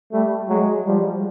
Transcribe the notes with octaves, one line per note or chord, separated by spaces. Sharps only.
G3 A3
F#3 G#3
F3 G3